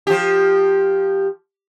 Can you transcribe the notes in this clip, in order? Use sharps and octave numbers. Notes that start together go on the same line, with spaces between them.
F3 G4